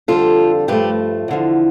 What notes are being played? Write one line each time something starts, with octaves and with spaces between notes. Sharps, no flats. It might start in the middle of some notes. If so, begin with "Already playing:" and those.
F2 D3 G3 F4 A4
G2 F3 A3 G4 B4
E2 D3 F3